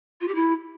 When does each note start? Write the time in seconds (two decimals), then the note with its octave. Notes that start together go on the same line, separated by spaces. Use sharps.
0.20 F4
0.28 G4
0.35 E4